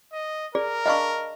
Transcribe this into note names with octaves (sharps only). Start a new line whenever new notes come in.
D#5
G#4 A#4 D5
D4 D#5 F5 B5 C#6